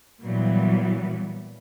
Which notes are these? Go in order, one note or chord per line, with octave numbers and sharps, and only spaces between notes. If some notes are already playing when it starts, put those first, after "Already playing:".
A#2 E3 F#3 G3 B3